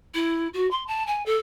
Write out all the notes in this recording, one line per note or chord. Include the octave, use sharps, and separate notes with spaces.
E4
F#4
C6
A5
G#5
A4